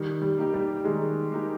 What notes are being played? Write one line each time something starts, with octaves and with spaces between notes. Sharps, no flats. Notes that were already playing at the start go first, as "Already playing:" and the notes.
Already playing: D#3 G3
G3
A#3 D#4 G4
G3
D#3 G#3
A#3 D#4 G4